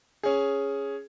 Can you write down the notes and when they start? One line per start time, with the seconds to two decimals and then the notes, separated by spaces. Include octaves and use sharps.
0.23 C#4 G#4